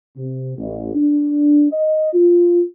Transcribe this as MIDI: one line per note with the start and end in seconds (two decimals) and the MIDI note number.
0.16 0.53 48
0.57 0.91 33
0.95 1.68 62
1.72 2.13 75
2.14 2.61 65